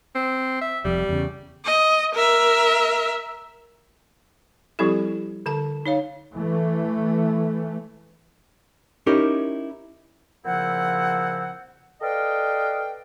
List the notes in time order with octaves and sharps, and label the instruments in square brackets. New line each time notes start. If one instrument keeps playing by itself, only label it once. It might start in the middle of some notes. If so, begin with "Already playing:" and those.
[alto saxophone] C4
E5
[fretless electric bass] F1 F2 [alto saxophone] G3
[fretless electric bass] E2 C#3
[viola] D#5
A#4 E5
[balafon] F3 G3 C4 E4 G4 A4
D3 A4 A5
D#4 C#5 F5
[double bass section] E3 A3
[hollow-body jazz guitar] C#4 D#4 E4 G4 A#4
[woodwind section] A#2 C#3 F3 C4 E4 F#5
A4 B4 D5 D#5 F5 G5